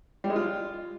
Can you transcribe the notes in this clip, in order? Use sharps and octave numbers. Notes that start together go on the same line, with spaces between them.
G3
G#3
F4